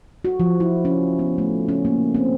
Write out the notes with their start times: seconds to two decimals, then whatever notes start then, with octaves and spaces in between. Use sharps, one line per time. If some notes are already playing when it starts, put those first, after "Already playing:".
0.25 F#4
0.40 F3
0.60 E4
0.85 C#4
1.19 B3
1.38 A3
1.69 C#4
1.85 A#3
2.14 C4